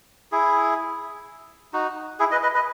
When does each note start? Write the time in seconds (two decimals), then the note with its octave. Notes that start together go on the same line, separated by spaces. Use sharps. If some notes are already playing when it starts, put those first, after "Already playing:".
0.32 E4 G#4
1.73 D#4 F#4
2.19 E4 G#4
2.31 B4 D#5
2.43 B4 D#5
2.55 B4 D#5